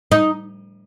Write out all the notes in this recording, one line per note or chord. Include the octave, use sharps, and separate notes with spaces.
D#4